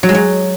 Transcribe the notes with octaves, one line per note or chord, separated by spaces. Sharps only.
F#3
G#3
F#3